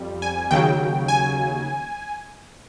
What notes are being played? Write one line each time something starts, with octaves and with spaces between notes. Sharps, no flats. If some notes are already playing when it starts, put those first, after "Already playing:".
Already playing: F2 G3
G#5
D#2 C#3 F#3 G5
G#5